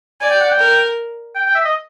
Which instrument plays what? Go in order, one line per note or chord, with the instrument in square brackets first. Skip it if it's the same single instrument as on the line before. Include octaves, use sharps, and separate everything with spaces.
[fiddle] D5 [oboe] G#5
[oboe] G5
F#5
G5
[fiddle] A#4
[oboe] G5
G5
E5
D#5